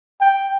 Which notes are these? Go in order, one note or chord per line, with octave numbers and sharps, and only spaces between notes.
G5